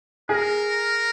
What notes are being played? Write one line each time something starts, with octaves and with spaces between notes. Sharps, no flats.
G#4 A#4